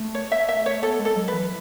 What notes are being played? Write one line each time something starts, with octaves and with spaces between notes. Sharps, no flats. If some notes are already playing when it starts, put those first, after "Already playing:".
Already playing: A3
C#5
E5
E5
C#5
B3 A4
G#3
A4
F#3
B4
E3